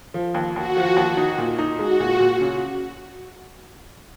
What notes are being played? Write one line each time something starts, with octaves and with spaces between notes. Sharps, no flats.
F3
D#2
D#2 F#4
F3
D#2
D#4
A#2
D#4
G#3 F#4
A#2
A#2
C#3